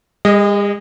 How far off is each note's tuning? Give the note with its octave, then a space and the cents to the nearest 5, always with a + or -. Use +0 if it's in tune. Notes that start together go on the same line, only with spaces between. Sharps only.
G#3 -45 A4 +0 D#5 +0